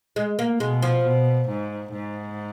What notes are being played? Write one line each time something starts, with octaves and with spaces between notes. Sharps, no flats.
G#3
A#3
B2 G#3
F3
B2
G#2
G#2